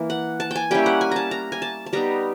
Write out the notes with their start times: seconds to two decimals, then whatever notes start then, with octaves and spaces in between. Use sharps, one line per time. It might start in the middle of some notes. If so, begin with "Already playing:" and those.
Already playing: E3 A#3
0.10 F#5
0.40 A5
0.51 G5 G#5
0.71 G3 A#3 C#4 E4 G5
0.86 F#5
1.01 G#5
1.12 A5 A#5
1.31 A#5
1.52 G#5
1.62 A5
1.86 A5
1.93 G3 B3 D#4 A#5